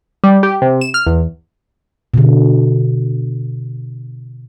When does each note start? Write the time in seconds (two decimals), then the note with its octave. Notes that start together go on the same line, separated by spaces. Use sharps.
0.24 G3
0.43 G4
0.62 C3
0.81 E7
0.94 F6
1.07 E2
2.14 B2 D3